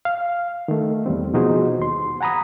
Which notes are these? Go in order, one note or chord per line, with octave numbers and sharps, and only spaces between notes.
F5
D#3 A3
E2 G3 C4
B2 F3 D#4 F#4 G#4 C5
D#2 C6
F#5 G#5 A#5 B5 D#6